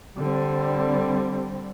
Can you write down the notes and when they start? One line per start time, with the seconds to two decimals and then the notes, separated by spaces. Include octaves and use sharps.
0.17 D3 G3 C4